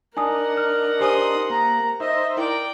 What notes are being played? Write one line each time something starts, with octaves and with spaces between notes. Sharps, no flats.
D4 D#4 A#4 F#5 G#5 A5 D#6
F6
G4 C5 G#5 C6 D#6
A#3 A#5
D#4 C5 D#5 E5
E4 A#4 D5 G5